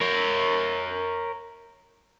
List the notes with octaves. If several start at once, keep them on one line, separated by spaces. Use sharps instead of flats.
A#4 C#5